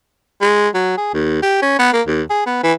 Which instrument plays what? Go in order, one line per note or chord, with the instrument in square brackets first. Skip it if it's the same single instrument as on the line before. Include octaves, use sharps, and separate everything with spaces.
[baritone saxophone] G#3
F#3
G#4
D#2
G4
C#4
B3
A#3
D#2
G#4
B3
E3